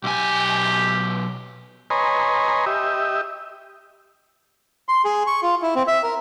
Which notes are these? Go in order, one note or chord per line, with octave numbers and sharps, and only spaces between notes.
B1 G4 G#5
B4 C#5 D#5 G#5 A#5 C6
G4 D#5 E5
C6
G#4
C#6
F4
E4
C4
E5
A#4